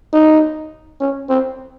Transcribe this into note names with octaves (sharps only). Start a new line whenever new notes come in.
D#4
C#4
C4